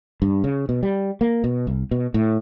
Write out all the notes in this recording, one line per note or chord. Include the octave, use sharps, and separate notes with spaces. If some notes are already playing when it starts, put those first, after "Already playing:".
G2
C#3
B2
G3
A#3
B2
C2
B2
A2